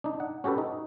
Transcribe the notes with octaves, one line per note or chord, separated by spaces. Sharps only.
D4 D#4
F#5
C#4 F#4 G4 A4 B4
D#4